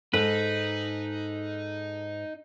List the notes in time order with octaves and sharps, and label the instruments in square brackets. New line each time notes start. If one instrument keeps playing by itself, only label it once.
[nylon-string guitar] G#2 [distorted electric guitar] D#4 [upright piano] A4 [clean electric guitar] B4